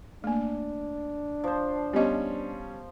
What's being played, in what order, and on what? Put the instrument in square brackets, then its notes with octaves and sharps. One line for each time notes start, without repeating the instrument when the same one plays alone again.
[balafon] A3 A#3 [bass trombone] D4
[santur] F3 C5
[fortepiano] G3 C#4 [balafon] B3 D#5